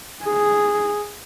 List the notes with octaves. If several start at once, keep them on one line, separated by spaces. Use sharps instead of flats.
G#4